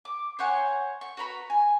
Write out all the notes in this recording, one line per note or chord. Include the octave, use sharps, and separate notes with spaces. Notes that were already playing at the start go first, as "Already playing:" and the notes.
D6
C5 C#5 F#5 G#5
C#6
F#4 B4 A#5 B5
G#5